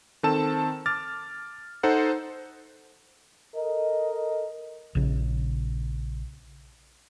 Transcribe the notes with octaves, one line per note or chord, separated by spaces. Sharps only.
D#3 C4 A4 A5 E7
D6 F6 A6
D#4 A4 C5 F#5
A4 A#4 D#5
A#1 C#3